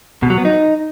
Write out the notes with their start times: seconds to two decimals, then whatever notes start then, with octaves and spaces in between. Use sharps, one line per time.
0.23 B2
0.30 F#3
0.38 B3
0.45 D#4